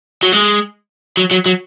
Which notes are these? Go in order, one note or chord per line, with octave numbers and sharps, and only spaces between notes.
F#3
G#3
F#3
F#3
F#3